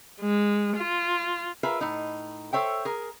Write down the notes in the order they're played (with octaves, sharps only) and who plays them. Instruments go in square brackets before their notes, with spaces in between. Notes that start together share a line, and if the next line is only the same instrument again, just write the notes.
[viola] G#3
F4
[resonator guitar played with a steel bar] F4 G#4 A#4 B4 E5
A2 D#4
A4 C5 C#5 E5 G5
G#4 A#4